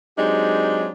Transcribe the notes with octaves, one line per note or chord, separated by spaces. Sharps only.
F#3 G#3 C4 D4 D#4 G4